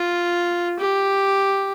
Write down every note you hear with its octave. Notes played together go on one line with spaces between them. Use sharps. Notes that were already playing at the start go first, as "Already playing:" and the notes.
Already playing: F4
G4